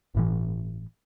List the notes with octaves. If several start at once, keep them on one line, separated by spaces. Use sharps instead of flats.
G1 A2 E3